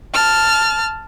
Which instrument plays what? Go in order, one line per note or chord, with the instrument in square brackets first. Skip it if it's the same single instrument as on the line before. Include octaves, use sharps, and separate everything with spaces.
[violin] A5 F6